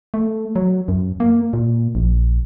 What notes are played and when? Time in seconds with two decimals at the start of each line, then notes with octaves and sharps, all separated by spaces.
0.14 A3
0.56 F#3
0.88 F#2
1.20 A#3
1.53 A#2
1.95 A#1